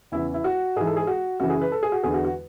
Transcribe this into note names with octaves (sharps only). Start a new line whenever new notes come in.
E2 C#3 E3 E4
E4
F#4
G#2 E3 G#4
A4
G#4
F#4
F#2 C#3 E3 F#4
G#4
B4
A4
G#4
F#4
E2 D3 G#4
F#4
F#4